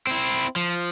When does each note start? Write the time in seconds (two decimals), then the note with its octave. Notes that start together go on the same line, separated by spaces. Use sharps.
0.07 C4 E4
0.56 F3